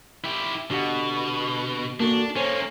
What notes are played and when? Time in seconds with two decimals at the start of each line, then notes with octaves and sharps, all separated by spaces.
0.24 E4 G4
0.70 B2 D3 G4 F#5
2.00 A#3 D4 F#4 A4
2.36 A#3 C#4 A4 C5 C#5